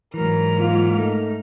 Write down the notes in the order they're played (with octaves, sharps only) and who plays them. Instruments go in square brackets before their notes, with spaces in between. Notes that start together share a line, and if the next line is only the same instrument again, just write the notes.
[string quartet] G#2 F6 [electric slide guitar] E3 F#3 [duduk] A#4
[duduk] A#3 [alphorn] F4
[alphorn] A3 [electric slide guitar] D#4